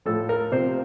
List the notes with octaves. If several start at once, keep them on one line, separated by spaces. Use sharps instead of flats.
A2 F3 A4
A#4
C3 F3 C5